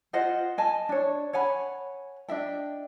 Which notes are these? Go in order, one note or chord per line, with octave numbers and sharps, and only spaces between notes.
F4 C5 D#5 F#5
D#5 G#5 A5
D4 C#5
C#5 F#5 G#5 B5
D4 D#5 E5 G5